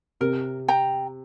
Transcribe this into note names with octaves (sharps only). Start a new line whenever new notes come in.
C3 A#4
G5 A#5